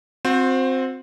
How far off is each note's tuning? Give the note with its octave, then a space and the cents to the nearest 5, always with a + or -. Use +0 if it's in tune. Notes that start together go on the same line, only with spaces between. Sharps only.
C4 +5 F#4 -35 C5 +0